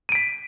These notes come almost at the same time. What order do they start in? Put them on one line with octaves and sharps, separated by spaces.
D#7 D7 B6